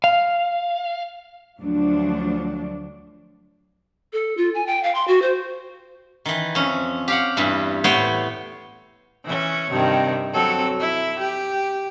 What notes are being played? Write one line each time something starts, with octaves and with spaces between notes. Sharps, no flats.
F5
D2 F3 F#3 D4
A4
F4
G#5
G5
F5
C6
F#4
C5
D#3 E3
F2 C#4
G4 F5 F#5
E2 G2 E3
A2 B3 C#5 G5 C6
E3 C#4
G2 C3 D#3
F#3 C4 A4
E4
G4